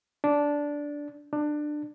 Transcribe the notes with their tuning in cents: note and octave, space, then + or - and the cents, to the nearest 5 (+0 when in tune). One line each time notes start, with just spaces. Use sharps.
D4 -10
D4 +20